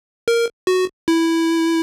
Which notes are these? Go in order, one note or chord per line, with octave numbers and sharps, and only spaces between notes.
A#4
F#4
E4